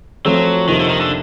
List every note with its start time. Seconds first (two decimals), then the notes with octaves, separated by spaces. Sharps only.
0.25 F3 F#3 A3 C4 F4 A4
0.68 F2 C3 D#3 F3 A#3 D#4
0.80 D3
0.89 D#3
1.00 D3